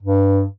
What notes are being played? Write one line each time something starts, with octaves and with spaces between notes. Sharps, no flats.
G2